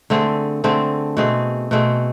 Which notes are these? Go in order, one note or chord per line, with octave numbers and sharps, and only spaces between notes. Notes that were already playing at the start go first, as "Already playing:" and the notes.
D3 A3 C4 G#4
D3 A3 C4 G#4
B2 A3 C4 G#4
B2 A3 C4 G#4